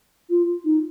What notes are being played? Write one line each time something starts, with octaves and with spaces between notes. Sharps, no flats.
F4
D#4